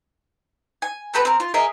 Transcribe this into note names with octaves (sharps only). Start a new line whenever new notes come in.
G#5
C4 G4 A4 B4
C4 A#4
F4
G#4 A#4 D#5 E5